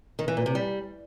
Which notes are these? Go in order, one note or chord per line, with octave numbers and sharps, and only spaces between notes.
D#3
E3
A#2
C3
G3